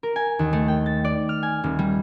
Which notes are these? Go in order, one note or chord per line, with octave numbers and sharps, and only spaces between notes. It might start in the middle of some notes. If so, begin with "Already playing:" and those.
A#4
G#5
D#2
A3
G5
A6
D5
F6
G#5
D#1
G3